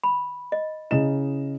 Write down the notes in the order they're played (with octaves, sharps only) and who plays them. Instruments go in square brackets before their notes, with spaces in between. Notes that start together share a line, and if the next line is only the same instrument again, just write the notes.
[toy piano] B5
D#5
[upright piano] C#3 D#5 E7 [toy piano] E4